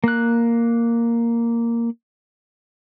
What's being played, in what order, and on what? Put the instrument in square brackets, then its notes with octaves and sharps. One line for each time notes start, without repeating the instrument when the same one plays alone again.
[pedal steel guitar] A#3 F#6